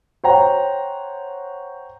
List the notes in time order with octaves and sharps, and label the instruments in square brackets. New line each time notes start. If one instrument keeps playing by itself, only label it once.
[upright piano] C5 C#5 F#5 G5 A#5